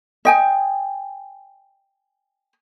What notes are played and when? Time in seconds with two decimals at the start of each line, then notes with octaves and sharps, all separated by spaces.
0.25 D#5 G5 G#5